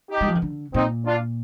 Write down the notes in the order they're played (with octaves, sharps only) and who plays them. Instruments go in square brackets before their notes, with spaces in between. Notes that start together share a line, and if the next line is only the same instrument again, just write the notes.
[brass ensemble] D#4 G4
[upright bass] G3
F3
D#3
D3
[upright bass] A#2 [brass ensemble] C4 D#4
[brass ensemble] D4 F4